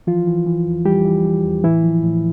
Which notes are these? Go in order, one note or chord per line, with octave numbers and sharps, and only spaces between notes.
E3 F3 F4
E3
E3
E2
E3 G3 G4
E3
E3
E2
A2 E3 E4
F3
A2